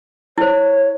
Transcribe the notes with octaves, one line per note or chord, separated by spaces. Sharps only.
E4 C5 C#5